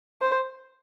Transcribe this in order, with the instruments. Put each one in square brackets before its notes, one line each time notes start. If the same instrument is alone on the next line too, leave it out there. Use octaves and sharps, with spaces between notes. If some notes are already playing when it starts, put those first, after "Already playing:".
[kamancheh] C5